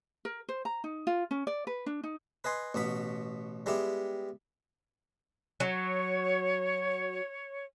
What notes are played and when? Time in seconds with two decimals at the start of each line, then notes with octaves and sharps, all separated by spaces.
0.25 A#4
0.49 C5
0.65 A#5
0.84 D#4
1.07 F4
1.31 C#4
1.47 D5
1.67 B4
1.86 D4
2.03 D#4
2.44 B4 D#5 G#5 C6
2.74 A1 B2 B3 B5
3.66 G3 G#3 B3 E4 G4
5.60 F#3 C#5